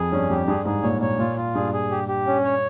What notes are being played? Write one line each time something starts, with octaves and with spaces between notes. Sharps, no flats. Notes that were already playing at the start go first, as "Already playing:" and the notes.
Already playing: F2 G#4
G2 C#4
F2 G4
G2 G#4
G#2 G#4
A#2 C#5
A#2 C#5
A#2 F4
F4
G2 G#4
G#4
G4
G4
C#4
C#5